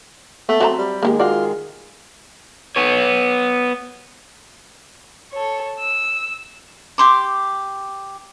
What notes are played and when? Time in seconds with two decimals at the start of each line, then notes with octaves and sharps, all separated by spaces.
0.49 A3 B3
0.60 F#3 C4 A#5
0.78 G3
1.03 D#3 G#3 A#3 E4 G4 G#4
1.20 F4 F#4 D5
2.76 B3 C#5
5.32 A4 C#5
5.80 E6
6.98 G4 C6 D6